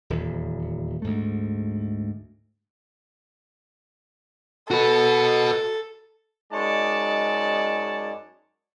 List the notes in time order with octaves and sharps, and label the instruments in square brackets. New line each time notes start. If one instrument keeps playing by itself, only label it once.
[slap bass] D#1 E2
D2 G#2 A3
[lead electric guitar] F#4 B4 [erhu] A4
[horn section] F#2 G#3 D#4 C#5 D5 A5